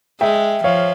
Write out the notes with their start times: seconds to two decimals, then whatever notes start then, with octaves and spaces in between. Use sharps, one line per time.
0.21 G#3 E5 G5
0.64 F3 C#5 F5